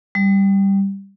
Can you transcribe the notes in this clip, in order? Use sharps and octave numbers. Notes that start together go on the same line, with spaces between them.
G3